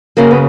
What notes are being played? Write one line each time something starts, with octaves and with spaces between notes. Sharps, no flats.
F#2 C#3 F#3 A#3
B3